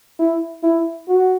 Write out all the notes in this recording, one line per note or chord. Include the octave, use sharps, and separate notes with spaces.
E4
E4
F#4